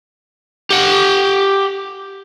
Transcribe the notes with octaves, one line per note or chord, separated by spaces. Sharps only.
G4 F#5